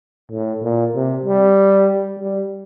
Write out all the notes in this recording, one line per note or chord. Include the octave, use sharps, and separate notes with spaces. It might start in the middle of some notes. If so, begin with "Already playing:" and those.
A2
A#2
C3
G3
G3